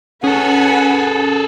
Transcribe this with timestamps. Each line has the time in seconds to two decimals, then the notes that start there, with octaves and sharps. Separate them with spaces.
0.24 C#4 G#4 A4 B4 F#5 G#5